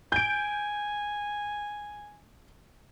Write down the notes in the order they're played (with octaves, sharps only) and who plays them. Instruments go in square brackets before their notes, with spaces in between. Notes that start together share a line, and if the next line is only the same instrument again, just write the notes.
[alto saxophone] G#5 [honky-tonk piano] G6 D7